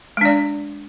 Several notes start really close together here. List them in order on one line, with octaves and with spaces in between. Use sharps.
G#3 D4 D5